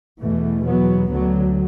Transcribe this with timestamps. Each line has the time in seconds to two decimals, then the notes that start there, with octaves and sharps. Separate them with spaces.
0.20 E2 B2 E3 A3
0.65 F#3 B3
1.11 D2 D3 F#3